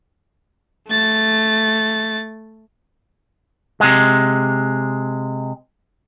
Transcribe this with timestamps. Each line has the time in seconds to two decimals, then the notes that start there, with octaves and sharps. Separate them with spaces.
0.88 A3 A6
3.80 C3 G#3